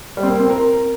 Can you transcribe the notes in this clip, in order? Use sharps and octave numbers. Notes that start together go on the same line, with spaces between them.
G3
C4
A#3
C4
A#4